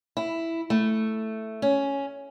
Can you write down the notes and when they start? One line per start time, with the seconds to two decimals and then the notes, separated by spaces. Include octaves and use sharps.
0.17 E4
0.70 A3
1.62 C#4